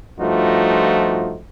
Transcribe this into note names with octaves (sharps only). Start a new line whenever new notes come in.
G2 F3 A3 D#4 F4 F#4